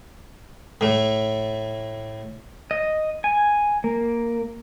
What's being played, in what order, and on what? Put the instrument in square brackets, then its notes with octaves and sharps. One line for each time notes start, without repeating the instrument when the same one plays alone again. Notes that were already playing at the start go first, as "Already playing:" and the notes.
[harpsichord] A2 A3
[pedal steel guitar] D#5
G#5
A#3